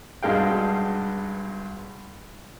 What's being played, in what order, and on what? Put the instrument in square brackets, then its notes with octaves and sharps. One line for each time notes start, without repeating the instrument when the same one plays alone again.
[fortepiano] B1 G2 G#3 F5 G5